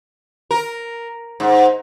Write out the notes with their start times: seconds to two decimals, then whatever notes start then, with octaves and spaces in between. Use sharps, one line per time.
0.51 A#4
1.40 G#2